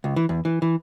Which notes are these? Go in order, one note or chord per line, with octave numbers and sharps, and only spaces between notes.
C#2
E3
E2
E3
E3